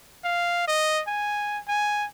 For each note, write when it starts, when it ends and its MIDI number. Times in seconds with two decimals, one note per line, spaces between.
0.25 0.68 77
0.68 1.03 75
1.07 1.59 80
1.68 2.06 80